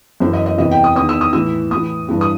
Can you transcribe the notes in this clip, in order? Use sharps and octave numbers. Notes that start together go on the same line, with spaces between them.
F#2 E3 C5
D#5
D#5
E2 C3 E3 D#5
G5
D#6
E2 D#3 D#6
E6
D#6
A2 E3 E6
A2 E3 D#6
G2 E3
D#6